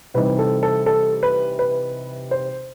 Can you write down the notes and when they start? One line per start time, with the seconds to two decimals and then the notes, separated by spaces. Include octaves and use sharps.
0.14 C3 E3 G3 C4 D#4 B4
0.39 A4
0.63 A4
0.86 A4
1.23 B4
1.59 B4
2.31 C5